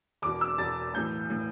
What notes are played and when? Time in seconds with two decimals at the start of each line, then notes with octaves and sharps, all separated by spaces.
0.22 E1 E2 B2 D6
0.41 E6
0.58 E1 E2 B2 A6
0.94 B1 A2 E3 G6
1.30 A2 E3